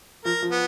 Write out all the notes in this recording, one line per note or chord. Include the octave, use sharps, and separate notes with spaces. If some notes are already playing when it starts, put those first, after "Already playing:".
F3 A#4
F3
B3